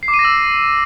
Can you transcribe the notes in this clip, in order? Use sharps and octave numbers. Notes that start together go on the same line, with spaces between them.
C7
D6
D#7
A#6
E6